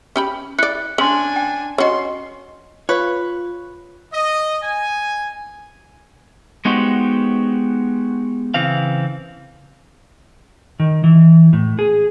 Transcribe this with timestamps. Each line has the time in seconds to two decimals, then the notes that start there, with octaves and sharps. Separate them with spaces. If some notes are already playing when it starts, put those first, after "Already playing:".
0.16 C#4 G4 B5
0.59 E4 D5 F#6 C#7
0.98 C#4 D4 G#5 C6 F#7
1.36 G5
1.78 C#4 F#4 C#5 D#5 C6
2.89 F4 B4 C#5
4.13 D#5
4.63 G#5
6.65 G#3 B3 D#4 F#4 G4 C5
8.54 C#3 E3 C4 F5
10.80 D#3
11.04 E3
11.53 A2
11.79 G#4